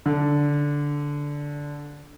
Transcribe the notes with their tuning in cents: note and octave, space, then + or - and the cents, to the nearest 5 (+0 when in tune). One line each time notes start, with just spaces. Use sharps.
D3 -10